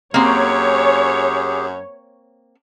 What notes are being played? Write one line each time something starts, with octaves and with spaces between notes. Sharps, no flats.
F#2 A#3 C4 G4 G#4 C#5